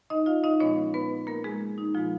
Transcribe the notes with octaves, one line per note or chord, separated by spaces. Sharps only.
D#4 D#5
F4 F5
D#4 D#5
A#2 F3 G#3 B3 C#4 C#5
B3 B4
A#3 A#4
G#3 G#4
D#4
A#2 F3 G#3 B3 F4